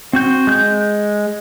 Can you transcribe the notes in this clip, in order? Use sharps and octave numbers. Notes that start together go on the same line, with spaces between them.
C4 F#4 G6
G#3 G6